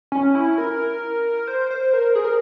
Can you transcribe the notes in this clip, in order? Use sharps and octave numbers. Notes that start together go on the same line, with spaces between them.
C#4
E4
A#4
C5
C5
A#4
G#4
A#4